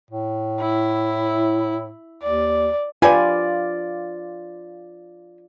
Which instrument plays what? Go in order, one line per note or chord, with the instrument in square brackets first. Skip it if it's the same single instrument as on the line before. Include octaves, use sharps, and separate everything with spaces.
[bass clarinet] A2
[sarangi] E4
[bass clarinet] D#2 [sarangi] D5
[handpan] F4 D5 [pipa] G4 B4 G#5